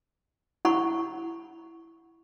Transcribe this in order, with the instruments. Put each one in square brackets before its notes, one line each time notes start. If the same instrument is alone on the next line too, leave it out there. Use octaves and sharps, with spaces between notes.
[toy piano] E4 F#5 B5 C#6